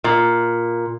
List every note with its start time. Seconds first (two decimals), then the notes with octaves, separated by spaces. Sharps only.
0.04 A#2